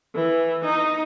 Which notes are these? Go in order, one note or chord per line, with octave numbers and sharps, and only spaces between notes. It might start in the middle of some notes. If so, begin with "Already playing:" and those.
E3
D#4